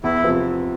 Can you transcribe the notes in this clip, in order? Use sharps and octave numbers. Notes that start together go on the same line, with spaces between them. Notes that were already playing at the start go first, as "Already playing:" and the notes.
E2 E4
C3 F3